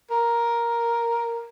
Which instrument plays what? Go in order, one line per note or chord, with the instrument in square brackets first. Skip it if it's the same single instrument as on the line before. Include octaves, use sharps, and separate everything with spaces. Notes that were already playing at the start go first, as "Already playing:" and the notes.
[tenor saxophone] A#4